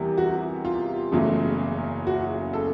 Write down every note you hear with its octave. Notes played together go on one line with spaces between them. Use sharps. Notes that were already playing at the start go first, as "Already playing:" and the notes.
Already playing: E2 C3 E3 G3 A#3
F#4
F4
F#1 E2 C#3 F#3 A3
F#4
A4